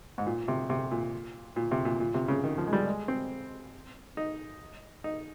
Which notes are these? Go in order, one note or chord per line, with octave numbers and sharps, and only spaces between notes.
G#2
A#2
C3
C3
A#2
A#2
C3
A#2
A#2
C3
C#3
D#3
F3
G#3
G3
G#3
C4
D#4
D#4